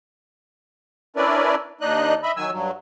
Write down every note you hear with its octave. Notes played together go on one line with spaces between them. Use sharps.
C#4 D4 E4 A#4 B4 D5
D#2 D4 D#4 D#5 F#6
D#5 E5 B5
D#3 F#3 G#5 E6
G2 F#3